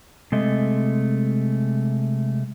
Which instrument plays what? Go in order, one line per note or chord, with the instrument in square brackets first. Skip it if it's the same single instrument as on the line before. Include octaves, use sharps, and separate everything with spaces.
[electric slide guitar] C3 G#3 A3 D#5